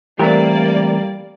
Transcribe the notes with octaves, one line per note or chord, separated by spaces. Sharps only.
E3 G3 A3 A#3 C4 G4 A#4 D5